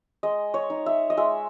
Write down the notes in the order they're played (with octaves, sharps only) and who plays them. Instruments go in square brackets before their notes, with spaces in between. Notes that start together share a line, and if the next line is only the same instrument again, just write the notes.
[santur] G#3 D#5
C#5
D#4
E5
D#5
G#3 E5